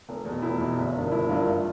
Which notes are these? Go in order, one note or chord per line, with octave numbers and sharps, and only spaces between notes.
F1
E2 B2
F1 E4
E2 B2
G1
G2 D#3
G1 E4
G2 D#3 F4
G#1 F4